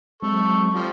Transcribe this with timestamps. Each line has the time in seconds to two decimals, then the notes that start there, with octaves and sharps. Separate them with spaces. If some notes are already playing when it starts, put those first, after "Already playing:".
0.22 F#3 G#3 C4 A4 C#6
0.74 F3 G3